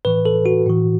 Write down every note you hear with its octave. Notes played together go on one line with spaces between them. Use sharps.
A2 E3 B4
A4
F#4
A2 E3